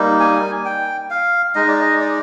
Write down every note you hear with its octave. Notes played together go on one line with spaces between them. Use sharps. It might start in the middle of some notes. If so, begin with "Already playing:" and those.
Already playing: G3 A#3 D#4
G#5
G5
F5
G#3 D#4 D#5
D5
D#5
D5